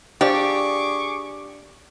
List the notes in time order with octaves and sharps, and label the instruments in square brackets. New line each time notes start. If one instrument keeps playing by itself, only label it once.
[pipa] F3 [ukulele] D4 D5 [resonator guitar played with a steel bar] G4 [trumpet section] G#4 C#6 D6